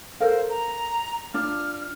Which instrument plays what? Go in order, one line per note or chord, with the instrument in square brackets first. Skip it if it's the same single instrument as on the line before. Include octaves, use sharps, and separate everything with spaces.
[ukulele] A4 A#4 F5 [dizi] C5
[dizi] A#5
[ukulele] D4 F4 [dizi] F6